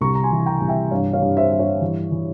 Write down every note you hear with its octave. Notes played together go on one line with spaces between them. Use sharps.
C2 A#5 C#6
A#5
G#5 C6
E3
G5 A#5
C2
E5 G5
G2 C#5 F5
C#5 F5
G2
C5 E5
G2 E5
C#5
E3
E3